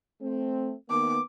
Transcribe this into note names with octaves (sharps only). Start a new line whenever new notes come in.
A3 C4
D#3 A#3 B3 D6